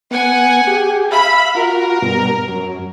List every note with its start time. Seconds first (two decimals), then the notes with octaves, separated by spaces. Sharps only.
0.11 B3 F#5 G#5
0.67 G4 G#4
1.12 E5 F5 B5
1.55 F4 F#4 A#4
2.02 G2 B2
2.48 F#2